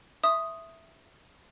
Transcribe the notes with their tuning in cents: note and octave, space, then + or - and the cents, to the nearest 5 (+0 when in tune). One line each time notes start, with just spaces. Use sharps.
E5 +0 C6 +40 D#6 +0